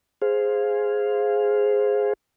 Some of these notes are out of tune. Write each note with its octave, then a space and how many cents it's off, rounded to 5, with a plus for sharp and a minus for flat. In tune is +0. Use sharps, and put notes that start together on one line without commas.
G#4 +0 C5 +0 F5 +0